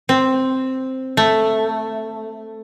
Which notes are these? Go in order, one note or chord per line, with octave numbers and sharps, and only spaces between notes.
C4
A3